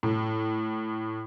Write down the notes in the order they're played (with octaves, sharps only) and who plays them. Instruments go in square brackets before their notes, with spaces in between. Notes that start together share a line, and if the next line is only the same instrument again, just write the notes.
[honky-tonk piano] A2